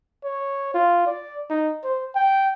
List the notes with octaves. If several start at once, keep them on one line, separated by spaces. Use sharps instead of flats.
C#5
F4
D5
D#4
C5
G5